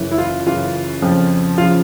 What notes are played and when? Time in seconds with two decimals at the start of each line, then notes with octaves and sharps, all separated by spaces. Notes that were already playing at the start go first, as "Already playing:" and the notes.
Already playing: F#2 C#3 E3
0.11 E4
0.18 F4
0.46 F#2 C#3 E3 F4
1.02 F2 C#3 F3
1.58 C#3 F3 F4